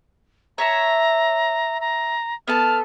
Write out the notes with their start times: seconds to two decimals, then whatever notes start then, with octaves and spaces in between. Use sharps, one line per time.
0.58 C#5 E5 A5 A#5
1.81 A#5
2.48 B3 A4 A5 F6